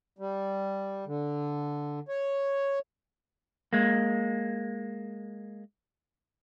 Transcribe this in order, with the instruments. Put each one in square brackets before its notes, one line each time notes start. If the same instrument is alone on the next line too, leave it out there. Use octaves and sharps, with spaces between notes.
[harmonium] G3
D3
C#5
[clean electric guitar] G#3 A#3